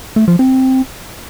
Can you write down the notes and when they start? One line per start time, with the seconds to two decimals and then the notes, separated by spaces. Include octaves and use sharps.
0.16 A3
0.28 F3
0.39 C4